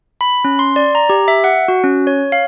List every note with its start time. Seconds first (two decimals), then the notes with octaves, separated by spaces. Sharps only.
0.21 B5
0.45 C#4
0.59 C6
0.76 D5
0.95 A#5
1.09 G4
1.28 E5
1.44 F#5
1.68 F#4
1.84 C#4
2.07 C#5
2.32 F5